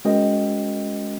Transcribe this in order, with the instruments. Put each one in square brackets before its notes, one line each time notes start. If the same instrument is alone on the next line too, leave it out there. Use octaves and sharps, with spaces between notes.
[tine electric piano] G#3 C#4 F#4 A#4 D#5 G5